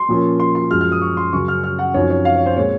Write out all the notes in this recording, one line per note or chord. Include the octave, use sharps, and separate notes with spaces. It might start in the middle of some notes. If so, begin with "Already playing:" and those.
Already playing: C6
A#2 F3 A#3 C#4
C6
C6
F#2 F3 G#3 F6
F6
D#6
C#6
C6
F#2 C#3 F#3 C#6
F6
F6
F#5
F#2 F3 C4 D#4 C#5
C#5
F5
C#5
C5
A#2 G#3 C4 C#5